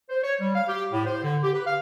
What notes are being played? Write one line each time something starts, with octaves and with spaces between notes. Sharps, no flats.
C5
C#5
G3
F5
G4
A2
C5
D3
G4
B4
F5